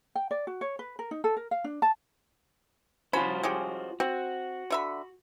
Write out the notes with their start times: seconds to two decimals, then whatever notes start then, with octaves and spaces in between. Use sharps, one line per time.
0.15 G5
0.31 D5
0.47 F#4
0.61 C#5
0.79 B4
0.99 A#4
1.11 D#4
1.24 A4
1.37 A#4
1.51 F5
1.64 D4
1.82 A5
3.13 C#4 F4 F#4 C5 B5
3.43 G#3 C#4 G4
4.00 C4 F#4
4.70 D3 E5 B5